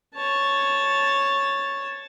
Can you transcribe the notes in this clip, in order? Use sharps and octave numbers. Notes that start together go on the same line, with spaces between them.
C#5 A5